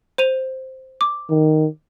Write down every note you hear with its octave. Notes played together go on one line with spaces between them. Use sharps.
C5 D#7 F7
D6
D#3